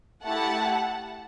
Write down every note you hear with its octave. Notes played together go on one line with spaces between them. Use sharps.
A3 E4 G4 F#5 A5